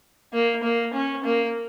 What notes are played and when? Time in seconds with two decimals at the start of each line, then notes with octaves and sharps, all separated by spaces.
0.33 A#3
0.63 A#3
0.94 C#4
1.24 A#3